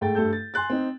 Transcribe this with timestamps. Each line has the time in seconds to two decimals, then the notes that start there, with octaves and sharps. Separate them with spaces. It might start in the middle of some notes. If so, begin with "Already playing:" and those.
0.01 G#2 A3 G5 A6
0.15 G2 A3 A4 G6
0.33 A6
0.54 G#5 C6 F#6 A6
0.70 C4 D#4